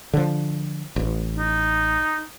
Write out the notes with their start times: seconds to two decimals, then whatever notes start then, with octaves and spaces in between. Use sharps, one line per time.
0.13 D3 F3
0.96 A1
1.36 D#4